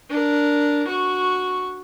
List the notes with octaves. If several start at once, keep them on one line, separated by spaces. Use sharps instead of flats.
D4 A#4
F#4 C#6